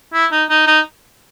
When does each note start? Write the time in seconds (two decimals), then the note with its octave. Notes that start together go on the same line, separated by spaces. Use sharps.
0.13 E4
0.32 D#4
0.49 D#4
0.67 D#4